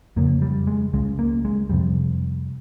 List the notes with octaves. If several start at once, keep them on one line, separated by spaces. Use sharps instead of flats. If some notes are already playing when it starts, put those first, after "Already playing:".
F2 C#3 A#3
G3
G#3
C#2 C#3 G#3
A#3
G#3
F2 C3 G3